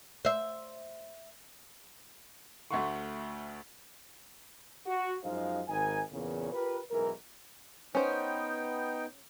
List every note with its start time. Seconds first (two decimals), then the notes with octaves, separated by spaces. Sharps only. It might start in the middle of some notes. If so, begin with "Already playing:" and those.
0.25 C5 E5
2.70 D2 A3 E5 F#5 C6 C#6
4.87 F#4
5.24 F#2 F3 G#3 D#4 C5 F5
5.69 G#1 D#3 D#4 A#4 G#5
6.12 E2 A#2 C#3
6.53 F4 G4 A#4 B4
6.91 B1 G#2 E3 A#4
7.95 B3 C#4 D#4 C5 G5